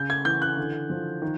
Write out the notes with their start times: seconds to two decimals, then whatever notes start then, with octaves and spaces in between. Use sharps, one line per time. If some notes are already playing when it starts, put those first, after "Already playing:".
Already playing: C#3 G6
0.10 G#6
0.25 E3 G6
0.42 F#6
0.57 D3
0.90 F3
1.22 D#3